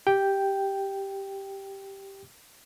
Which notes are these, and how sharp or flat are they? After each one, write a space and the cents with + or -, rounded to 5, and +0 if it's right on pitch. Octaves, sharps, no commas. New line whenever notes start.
G4 +0 G5 +0